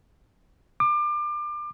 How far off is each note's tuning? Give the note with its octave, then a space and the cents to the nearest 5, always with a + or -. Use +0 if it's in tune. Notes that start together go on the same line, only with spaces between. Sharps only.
D6 +30